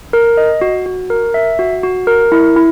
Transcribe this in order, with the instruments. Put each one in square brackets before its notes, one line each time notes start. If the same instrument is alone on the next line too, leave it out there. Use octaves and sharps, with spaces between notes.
[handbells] A#4
D#5
F#4
F#4
A#4
E5
F#4
F#4
A#4
E4
E4